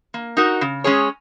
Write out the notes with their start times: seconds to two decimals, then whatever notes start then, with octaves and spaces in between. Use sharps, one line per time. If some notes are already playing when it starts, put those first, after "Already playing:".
0.14 A#3
0.37 D#4 F#4 A#4
0.61 C#3
0.84 G#3 C#4 G#4 C#5